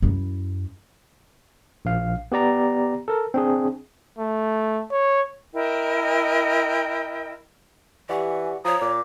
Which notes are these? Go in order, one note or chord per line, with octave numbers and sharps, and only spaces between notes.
F#2 E4
A#1 F5
B3 G4 D5 A#5
A4 A#4
C4 D4 G#4
A3
C#5
E4 A#4 D#5 G5
E3 G4 D5 F#5 G#5 C#6
F3 C#5 A#5 D#6
A#2 D6